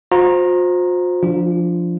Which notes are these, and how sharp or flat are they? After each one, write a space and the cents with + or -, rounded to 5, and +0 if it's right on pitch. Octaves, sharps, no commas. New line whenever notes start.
F4 +45 C5 +0 A#5 +0
F3 -5 D4 +0 F4 -10